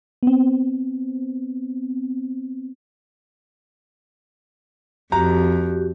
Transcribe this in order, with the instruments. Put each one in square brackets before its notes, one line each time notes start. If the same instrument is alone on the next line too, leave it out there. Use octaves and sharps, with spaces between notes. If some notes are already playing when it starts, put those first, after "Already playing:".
[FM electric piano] B3 C4
[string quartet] F2 [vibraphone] F#4 G4 [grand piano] A#5